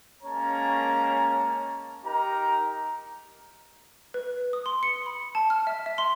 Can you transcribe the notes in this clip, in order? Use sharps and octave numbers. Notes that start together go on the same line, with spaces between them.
G#3 A#3 C#4 C#5 A5 A#5
D#4 G4 A#4 A#5
B4
D#6
C6
C#7
B5
A5
F6
E5
E5
C6